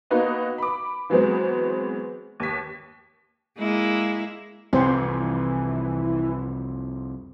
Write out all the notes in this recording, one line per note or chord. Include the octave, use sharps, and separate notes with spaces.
A#3 B3 D#4 F#4 B4 D#5
B5 D6
E3 F#3 G#3 B3 C4
D#2 B6
G#3 A#3 E4
C2 F2 C3 E3 C4 C5